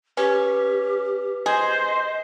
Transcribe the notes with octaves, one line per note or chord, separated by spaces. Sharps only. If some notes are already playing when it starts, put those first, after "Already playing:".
C#4 G4 B4
G#4 C5 D#5